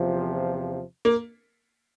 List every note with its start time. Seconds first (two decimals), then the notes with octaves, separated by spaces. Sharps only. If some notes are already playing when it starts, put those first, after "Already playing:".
Already playing: E2 C3 F3
1.05 A#3